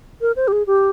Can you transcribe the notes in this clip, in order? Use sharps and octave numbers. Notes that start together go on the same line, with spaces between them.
A#4
C5
G4
G#4
G4